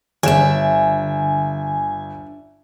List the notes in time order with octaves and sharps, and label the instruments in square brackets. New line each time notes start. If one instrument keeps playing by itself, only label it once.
[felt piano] G1 E7 [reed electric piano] D3 [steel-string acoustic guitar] D4 E5 [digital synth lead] G#5